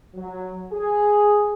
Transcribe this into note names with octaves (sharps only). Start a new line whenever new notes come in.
F#3
G#4